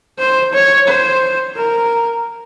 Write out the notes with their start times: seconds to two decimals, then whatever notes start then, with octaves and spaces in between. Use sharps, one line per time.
0.19 C5
0.53 C#5
0.88 C5
1.57 A#4